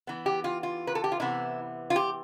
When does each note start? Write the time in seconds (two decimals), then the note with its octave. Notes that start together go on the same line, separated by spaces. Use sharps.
0.07 E3 B3
0.26 G4
0.44 F4
0.63 F4
0.87 B4
0.95 A4
1.04 G4
1.12 F4
1.20 C3 E3 B3 E4
1.90 F4
1.96 G4